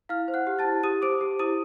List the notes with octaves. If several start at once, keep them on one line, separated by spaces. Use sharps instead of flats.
E4 F5 F6
C5
F#5 F#6
G4
A5 A6
E4
G4 D#6 D#7
C5 D6 D7
G4
E4 D#6 D#7